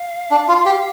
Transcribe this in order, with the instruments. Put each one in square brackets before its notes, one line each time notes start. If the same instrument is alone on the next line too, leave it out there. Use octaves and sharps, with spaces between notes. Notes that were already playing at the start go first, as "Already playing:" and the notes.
Already playing: [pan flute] F5
[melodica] D4
F4
G4